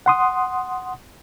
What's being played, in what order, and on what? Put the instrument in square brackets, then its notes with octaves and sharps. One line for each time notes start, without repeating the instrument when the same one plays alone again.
[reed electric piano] F#5 C6 D#6